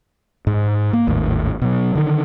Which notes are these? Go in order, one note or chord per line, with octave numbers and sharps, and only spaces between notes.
G#2
A#3
G#1 D#2 A2
B2 F#3
D3 D#3